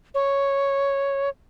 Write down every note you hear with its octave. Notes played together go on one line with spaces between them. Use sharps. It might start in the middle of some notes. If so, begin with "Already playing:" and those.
C#5